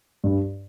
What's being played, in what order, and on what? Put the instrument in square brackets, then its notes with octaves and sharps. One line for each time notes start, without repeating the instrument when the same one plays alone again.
[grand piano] G2